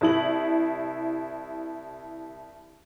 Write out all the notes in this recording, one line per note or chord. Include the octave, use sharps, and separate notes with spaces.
C2 E4 F#7